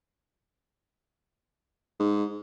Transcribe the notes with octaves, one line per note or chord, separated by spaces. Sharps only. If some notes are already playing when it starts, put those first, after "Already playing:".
G#2